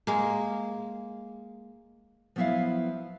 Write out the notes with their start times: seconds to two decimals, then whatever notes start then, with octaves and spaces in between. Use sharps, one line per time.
0.07 G#3 A#3
2.36 F3 F#3 B3 E4 E5 F5